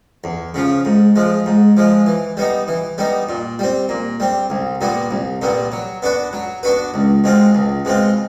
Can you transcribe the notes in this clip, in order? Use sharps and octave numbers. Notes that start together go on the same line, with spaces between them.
E2
C#3 F3
G#2
F3 G#3
G#2
F3 G#3
E3
G3 B3 D#4
E3
G3 B3 D#4
A#2
G3 C4
A#2
G3 C4
C2
A#2 G3 B3
C2
A#2 G3 B3
F#3
B3 D4 F#4 B4
F#3
B3 D4 F#4 B4
C#2
B2 G#3 C4 F4
C#2
B2 G#3 C4 F4